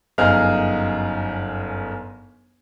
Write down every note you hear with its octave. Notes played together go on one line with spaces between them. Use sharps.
G1 F#2 D#4 G#4 F5 F6